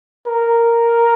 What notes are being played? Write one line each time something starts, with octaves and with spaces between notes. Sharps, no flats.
A#4